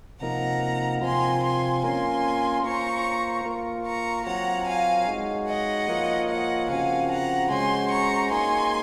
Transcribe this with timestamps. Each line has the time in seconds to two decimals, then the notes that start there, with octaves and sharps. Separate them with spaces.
0.21 C3 F3 A#3 D#4 A#4 F#5 A#5
1.02 C3 F3 C4 F4 G#5 C6
1.43 G#5 C6
1.83 A#3 C#4 F4 A#4 G#5 C6
2.64 A#3 F4 C5 A#5 C#6
3.45 A#3 F4 A#4
3.85 A#5 C#6
4.26 F#3 C4 F4 A#4 C#5 F#5 A#5
4.67 F5 G#5
5.07 G#3 D#4 F#4 C#5
5.47 D#5 F#5
5.88 F3 A#3 F4 A#4 C#5
6.28 D#5 F#5
6.69 C#3 F3 C4 F#4 F5 G#5
7.10 F#5 A#5
7.50 G#3 C#4 F#4 C5 G#5 C6
7.90 A#5 C#6
8.30 A#3 D#4 G#4 G#5 C6